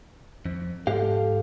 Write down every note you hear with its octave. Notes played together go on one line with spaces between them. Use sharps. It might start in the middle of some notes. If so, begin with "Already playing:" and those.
F2
G#2 G4 A4 F5